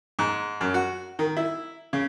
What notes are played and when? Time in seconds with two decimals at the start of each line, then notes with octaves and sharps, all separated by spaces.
0.19 G#2
0.61 F#2
0.74 F#4
1.19 D#3
1.37 E4
1.93 C#3